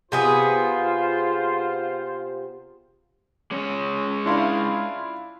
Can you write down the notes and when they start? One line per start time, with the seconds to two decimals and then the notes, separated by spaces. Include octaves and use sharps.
0.12 C3 B3 F4 G#4 C5
3.51 G#3 C#4 C#5
4.26 D4 E4 F4 F5